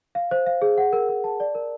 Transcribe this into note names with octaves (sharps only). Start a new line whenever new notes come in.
F5
C5
F5
G#4
F#5
A#4
A#4
A5
D5
A#4